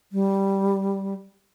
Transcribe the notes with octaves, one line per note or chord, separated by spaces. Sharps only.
G3